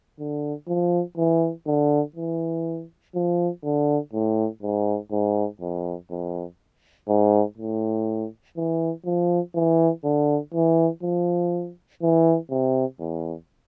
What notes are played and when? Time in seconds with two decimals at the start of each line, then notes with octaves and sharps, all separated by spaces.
0.19 D3
0.68 F3
1.17 E3
1.67 D3
2.16 E3
3.15 F3
3.64 D3
4.13 A2
4.63 G#2
5.12 G#2
5.61 F2
6.10 F2
7.08 G#2
7.58 A2
8.57 E3
9.06 F3
9.55 E3
10.04 D3
10.54 E3
11.03 F3
12.02 E3
12.50 C3
13.00 E2